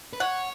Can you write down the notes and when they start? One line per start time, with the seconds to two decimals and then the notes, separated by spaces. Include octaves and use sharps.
0.13 B4
0.20 C#5 F#5